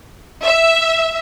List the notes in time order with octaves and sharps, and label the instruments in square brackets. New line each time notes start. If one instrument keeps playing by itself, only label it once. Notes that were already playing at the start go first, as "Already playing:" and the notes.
[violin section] E5